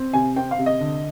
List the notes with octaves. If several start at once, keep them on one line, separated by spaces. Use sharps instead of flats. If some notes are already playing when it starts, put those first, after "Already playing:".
Already playing: C4
C3 G#5
C4 G5
F5
C3
D#5
D3